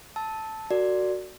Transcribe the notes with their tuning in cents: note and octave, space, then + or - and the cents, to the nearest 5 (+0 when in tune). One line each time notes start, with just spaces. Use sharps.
A5 +0 E6 -25
F#4 +0 A#4 -40 D5 +0